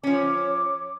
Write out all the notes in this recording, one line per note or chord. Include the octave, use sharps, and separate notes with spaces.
F3 C#4 C#5 D6